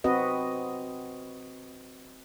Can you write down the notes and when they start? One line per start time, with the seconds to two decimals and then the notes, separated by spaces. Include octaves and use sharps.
0.04 C4 F#4 B4 D#5